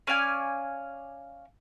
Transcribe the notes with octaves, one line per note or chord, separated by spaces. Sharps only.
C#4 D5 F5 G#5